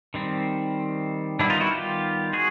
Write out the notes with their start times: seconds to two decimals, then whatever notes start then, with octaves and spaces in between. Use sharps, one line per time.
0.14 D#3 G3 C4
1.39 D#3 G3 B3 D4 E4
1.50 D#4 F4
1.60 E4 F#4
1.71 F4 G4
2.33 F#4 G#4